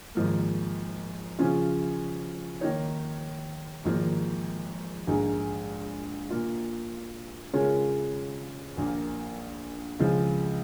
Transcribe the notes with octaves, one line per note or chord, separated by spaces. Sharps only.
G#1 G#2 F3 A#3
C#3 F3 C#4 F4
D#3 A#3 D#4 C#5
G#1 G#2 F3 A#3
A#1 G#2 G#3 D#4
A#2 A#3 F4
C#3 G#3 F4 A#4 C#5
A#1 A#2 A#3
C#2 C#3 F3 G#3